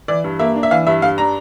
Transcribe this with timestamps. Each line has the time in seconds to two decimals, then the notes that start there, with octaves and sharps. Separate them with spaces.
0.08 E3 D5
0.24 G2
0.39 A#3 E5
0.56 D4
0.63 E5
0.71 E3 F5
0.87 G2 E5
1.02 G2 F5
1.18 D4 A#5